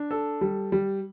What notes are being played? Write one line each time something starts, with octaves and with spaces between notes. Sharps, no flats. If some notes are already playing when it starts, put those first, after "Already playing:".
Already playing: D4
A4
G3
G3